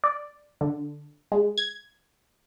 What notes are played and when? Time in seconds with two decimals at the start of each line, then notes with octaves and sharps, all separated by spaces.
0.04 D5
0.61 D3
1.32 G#3
1.58 G#6